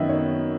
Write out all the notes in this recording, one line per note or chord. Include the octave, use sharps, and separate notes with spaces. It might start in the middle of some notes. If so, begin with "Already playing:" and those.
Already playing: F#2 D#3 F#3 B3 D#5 E5
C#5